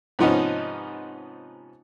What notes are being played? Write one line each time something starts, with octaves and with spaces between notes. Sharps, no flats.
G#2 C3 F3 B3 C#4 D#4